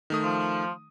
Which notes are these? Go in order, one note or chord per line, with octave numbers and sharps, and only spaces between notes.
D#3 A3 D#6
F3